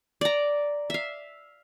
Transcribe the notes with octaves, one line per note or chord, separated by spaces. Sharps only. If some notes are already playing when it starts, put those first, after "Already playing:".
D5 A#5
E5 F5